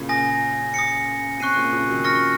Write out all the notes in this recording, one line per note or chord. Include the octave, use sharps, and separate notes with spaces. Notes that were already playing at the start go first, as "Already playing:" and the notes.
Already playing: A#2 C#3
G#5 D#6 A#6
D#6 A#6 C#7
C3 C#6 F#6 C7 D#7
A#2 C#3
C#3 F3
D#3 F#3
C#3 F3 C#6 F6 A#6 C#7